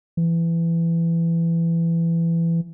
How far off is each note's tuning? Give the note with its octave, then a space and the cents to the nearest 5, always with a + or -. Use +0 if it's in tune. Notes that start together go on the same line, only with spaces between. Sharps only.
E3 +20